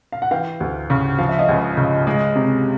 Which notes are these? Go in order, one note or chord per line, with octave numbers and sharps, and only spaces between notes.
F5
F#5
E3 F5 G5
D2
C#3
F3 F5
E5
D#5 F5
C#2
C#3
G#3
C3